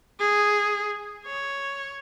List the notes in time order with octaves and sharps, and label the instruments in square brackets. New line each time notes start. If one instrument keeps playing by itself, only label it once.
[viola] G#4
C#5